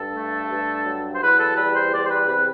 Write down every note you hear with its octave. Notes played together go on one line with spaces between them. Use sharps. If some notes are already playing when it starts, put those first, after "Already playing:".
Already playing: G2 A4
A3
G2
F#3
C5
E2 B4
A4
G3 B4
C5
E2 D5
C5
B4
C3 B4